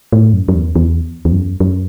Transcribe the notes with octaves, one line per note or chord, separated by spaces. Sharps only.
A2
F#2
F#2
E2
E2
E2
F#2
F#2